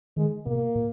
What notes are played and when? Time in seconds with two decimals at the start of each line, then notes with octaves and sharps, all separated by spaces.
0.17 D#3 G#3
0.46 B2 A#3
0.76 A#2